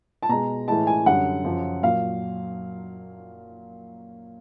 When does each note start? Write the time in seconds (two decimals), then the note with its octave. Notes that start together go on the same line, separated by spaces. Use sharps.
0.23 A5
0.29 B2 G#3 A#5
0.68 A2 E3 G#3 A5
0.87 G#5
1.06 F#2 D3 G3 F#5
1.44 F#2 C#3 F3
1.83 A#2 F#3 F5